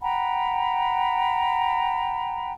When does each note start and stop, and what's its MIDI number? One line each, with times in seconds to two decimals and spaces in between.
0.01 2.52 78
0.01 2.52 79
0.01 2.52 82
0.01 2.52 83